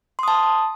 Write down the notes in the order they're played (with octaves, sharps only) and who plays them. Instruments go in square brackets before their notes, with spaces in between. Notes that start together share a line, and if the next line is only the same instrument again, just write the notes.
[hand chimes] C6
D#6
A5